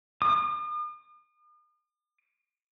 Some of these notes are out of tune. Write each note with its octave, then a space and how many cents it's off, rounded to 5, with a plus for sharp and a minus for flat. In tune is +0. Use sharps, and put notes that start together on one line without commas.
D#6 -45